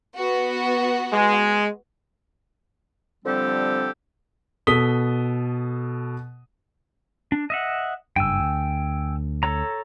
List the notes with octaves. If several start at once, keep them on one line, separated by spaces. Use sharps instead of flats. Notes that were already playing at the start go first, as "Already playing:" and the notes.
B3 F#4
G#3
D3 F3 G3 C4 G4 A4
B2 A4 D#6 B6 G7
D4
D#5 E5 F#5
F#1 G2 G5 G#5 E6
D2
A4 C#5 A#5